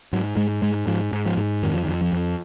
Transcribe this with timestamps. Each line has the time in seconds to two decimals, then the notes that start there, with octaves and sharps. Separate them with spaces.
0.13 G#2 F#3
0.37 G#2 G#3
0.62 G#2 G#3
0.87 G#2 F3
1.12 G#2
1.26 F3
1.37 G#2
1.63 F2 D#3
1.74 F3
1.85 D#3
1.89 F2
2.01 F3
2.13 F2